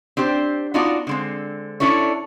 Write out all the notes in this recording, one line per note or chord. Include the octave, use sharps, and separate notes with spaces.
C4 D4 G4 C5
B3 D4 D#4 F4 F#4 D5
D3 G#3 C4
C#4 D4 E4 A4 C#5